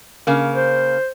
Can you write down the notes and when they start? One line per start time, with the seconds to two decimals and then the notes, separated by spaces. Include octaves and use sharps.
0.27 C#3 A#3
0.54 C5